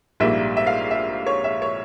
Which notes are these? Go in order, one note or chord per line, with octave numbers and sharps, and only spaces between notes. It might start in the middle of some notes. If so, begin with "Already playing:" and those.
A#1 G#2 G3 A#3 E5
E5
F5
E5
C#5
E5
C#5